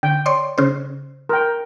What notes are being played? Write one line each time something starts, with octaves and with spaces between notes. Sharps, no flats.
D3 G5
C#5 D5 C6
C#3 C5
A#4 G5